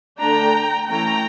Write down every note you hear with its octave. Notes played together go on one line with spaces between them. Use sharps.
D3 A3 D4 G5 A#5
E3 A3 C#4 G5 A#5